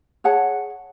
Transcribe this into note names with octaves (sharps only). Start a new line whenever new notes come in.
G#4 C#5 F#5 A5